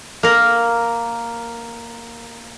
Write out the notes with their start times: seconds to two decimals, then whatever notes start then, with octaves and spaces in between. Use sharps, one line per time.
0.23 A#3 A#4